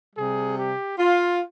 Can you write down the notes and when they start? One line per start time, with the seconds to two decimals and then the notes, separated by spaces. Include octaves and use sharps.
0.16 C3 G3 G#4
0.57 G4
0.98 F4